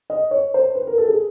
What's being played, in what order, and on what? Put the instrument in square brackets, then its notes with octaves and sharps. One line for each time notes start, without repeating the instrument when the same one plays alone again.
[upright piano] D#5
C#5
C5
B4
A#4
A4
G#4